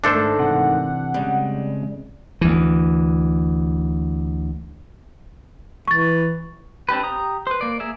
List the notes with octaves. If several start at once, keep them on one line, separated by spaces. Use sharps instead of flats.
G#2 D#3 A3 D4 A4 C5
C3 E3 F#5
C#3 G3 G#3 C4
D2 E3
E3 C#6 A6
C4 D4 G4 B4
G4 A#5 D#6
B4 C5
A#3 D5
A#3 G#4 E5